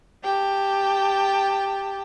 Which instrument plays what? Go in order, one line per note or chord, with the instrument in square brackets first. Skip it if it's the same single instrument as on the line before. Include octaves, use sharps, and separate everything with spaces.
[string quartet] G4 G5 A5